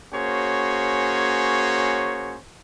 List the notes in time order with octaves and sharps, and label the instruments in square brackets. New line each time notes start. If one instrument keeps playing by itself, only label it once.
[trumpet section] A#3 C#4 F#4 G#4 C5 C#5